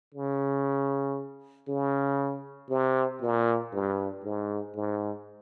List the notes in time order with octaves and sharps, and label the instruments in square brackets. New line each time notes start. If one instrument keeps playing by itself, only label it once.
[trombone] C#3
C#3
C3
A#2
G2
G#2
G#2